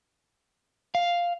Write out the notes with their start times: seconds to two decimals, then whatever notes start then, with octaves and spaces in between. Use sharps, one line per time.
0.95 F5